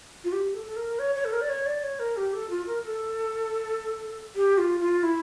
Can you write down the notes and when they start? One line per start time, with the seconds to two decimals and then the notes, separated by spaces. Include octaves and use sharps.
0.24 F4
0.32 G4
0.54 A4
0.66 A4
0.76 A#4
0.99 C#5
1.16 C#5
1.25 A4
1.33 A#4
1.41 D5
1.49 C#5
1.66 D5
1.83 C#5
1.99 A#4
2.17 G4
2.34 A4
2.50 F4
2.67 A#4
2.83 A4
4.36 G4
4.58 F4
4.80 F4
5.03 E4